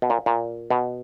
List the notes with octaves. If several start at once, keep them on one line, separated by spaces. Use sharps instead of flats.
B2
A#2
A#2
B2